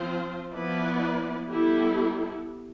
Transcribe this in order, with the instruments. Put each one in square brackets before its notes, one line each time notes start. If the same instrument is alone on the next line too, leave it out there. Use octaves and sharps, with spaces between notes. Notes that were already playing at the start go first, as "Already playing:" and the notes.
Already playing: [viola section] F3 C4 F4 C5
F3 B3 E4 B4 D5
G3 B3 E4 A4